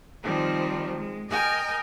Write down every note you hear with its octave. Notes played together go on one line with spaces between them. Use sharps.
D#3 F3 G3 C4
G#3
A#4 D#5 G5 G#5 F6